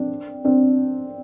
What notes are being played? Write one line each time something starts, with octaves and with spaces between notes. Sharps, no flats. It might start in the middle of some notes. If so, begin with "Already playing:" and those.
Already playing: C4 D4
C4 D4